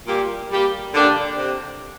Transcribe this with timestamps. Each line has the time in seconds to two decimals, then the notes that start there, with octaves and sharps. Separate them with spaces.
0.07 A#2 G3 A#3 G4
0.50 G3 A#3 G4
0.93 D3 A#3 D4 G4
1.36 C3